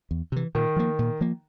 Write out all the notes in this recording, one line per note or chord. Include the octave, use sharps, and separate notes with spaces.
E2
C3 E3
A#2 D#3
F3 A#3
A#2
F3 A#3